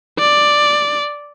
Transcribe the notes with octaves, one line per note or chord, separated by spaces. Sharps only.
D5